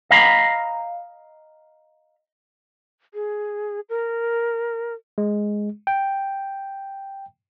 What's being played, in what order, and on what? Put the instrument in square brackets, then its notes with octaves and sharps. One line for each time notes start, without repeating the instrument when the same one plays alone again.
[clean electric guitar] D#5 F5 A#5 B5
[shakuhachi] G#4
A#4
[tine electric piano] G#3
G5